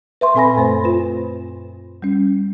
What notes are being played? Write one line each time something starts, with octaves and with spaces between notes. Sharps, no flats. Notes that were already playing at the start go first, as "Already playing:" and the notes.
B4 E5 C6 C#6
A#2 C4 A4 G#5 B5 A#6
F#2 A3 C5
F4 B4
G3 C#4